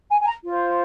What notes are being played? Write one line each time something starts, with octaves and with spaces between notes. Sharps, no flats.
G#5
G#5
A#5
F4 C5